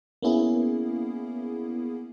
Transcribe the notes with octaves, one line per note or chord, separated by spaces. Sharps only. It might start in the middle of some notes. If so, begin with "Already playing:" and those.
A#3 B3 C#4 E4 G#4